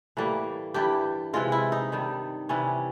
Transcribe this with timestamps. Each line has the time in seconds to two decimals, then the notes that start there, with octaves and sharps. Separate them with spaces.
0.17 A2 E3 G3 A#3
0.74 G2 E3 G3 G4
1.33 C3 E3 G#3 F4
1.52 E4
1.72 D#4
1.92 G2 D#3 G3
2.49 C3 E3 G3 C#4